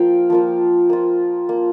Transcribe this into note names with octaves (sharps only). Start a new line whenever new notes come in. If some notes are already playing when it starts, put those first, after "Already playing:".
Already playing: F3 A#3 F4 F5 G5
F3 A#3 F4
A#3 F4
A#3 F4